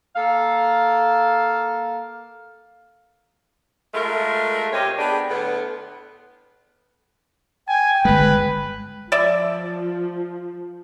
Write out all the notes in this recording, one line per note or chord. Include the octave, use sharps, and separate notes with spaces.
A#3 A4 F5
G#3 A3 F4 A#4
C3 C4 G4 C#5 D#5
B3 D4 G4 G#4
A2 D3 B3
G5 G#5
G1 G#3 B4
F3 D5 E5